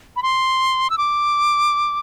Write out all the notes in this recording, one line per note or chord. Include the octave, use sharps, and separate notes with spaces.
B5
C6
E6
D6